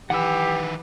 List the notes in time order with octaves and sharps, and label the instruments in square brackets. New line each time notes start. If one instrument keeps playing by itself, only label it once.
[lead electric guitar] D#3 B4 [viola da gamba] E3 [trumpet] G4 [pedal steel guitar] F#5 E6